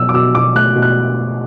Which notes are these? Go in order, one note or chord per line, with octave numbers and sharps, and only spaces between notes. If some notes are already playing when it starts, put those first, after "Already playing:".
Already playing: B2 F#3 E6
D6
B2 E6
B2 D6
A3 F#6
B2
F#6